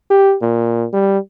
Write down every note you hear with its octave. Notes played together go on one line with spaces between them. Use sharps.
G4
A#2
G3